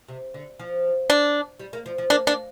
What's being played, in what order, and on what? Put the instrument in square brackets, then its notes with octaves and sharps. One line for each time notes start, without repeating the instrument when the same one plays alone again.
[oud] C3
D3
F3
[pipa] D4
[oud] G3
A#3
F3
F3
[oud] A#3 [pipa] D4
[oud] A#3 [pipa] D4